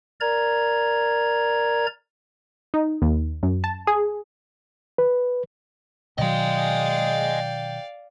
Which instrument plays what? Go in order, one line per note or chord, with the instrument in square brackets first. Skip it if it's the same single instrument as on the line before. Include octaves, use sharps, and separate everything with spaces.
[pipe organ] A#4 D5 A#5 G#6
[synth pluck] D#4
D#2
F#2
A5
G#4
[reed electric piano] B4
[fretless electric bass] B2 D#3 F#3 [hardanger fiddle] D5 F5 [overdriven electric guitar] D#5 G#5 [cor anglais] G5